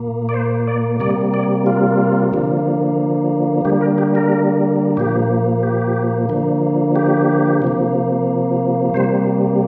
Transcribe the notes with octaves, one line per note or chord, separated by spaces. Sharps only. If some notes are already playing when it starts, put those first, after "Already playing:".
Already playing: A#2 A#3
D5
C5
D5
C3 G3 A#3 D5
D5
F4
D3 F3 A#3
D3 G3 A#3 G4
A#4
G4
A#4
A#2 F3 A#3 G4
G4
D3 F3 A#3
G4
C3 F3 A#3
C3 G3 A#3 C5